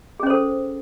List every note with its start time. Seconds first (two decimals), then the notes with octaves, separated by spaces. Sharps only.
0.20 G#4
0.23 C#4
0.27 C5
0.30 A4